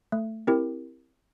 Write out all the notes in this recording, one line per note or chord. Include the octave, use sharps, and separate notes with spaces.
A3
C4 E4 G4 A#4